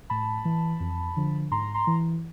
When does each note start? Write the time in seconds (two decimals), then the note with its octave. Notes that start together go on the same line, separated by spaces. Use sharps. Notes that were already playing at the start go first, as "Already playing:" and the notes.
0.10 A2 A5 B5
0.45 E3
0.80 F2
1.17 D3 F3
1.51 G#2 A#5 C6
1.74 A#5 C6
1.87 E3